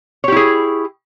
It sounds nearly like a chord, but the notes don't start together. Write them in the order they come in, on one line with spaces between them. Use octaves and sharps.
C#5 G4 E4 G#4